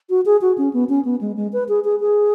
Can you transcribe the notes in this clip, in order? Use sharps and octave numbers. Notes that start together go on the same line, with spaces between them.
F#4
G#4
F#4
C#4
B3
C#4
B3
G#3
G#3
B4
G#4
G#4
G#4